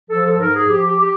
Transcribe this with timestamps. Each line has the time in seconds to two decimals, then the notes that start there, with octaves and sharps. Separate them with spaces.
0.09 F3 A4
0.24 A4
0.39 G#2 A#4
0.54 G#4
0.68 F3 G4
0.83 G4
0.99 G4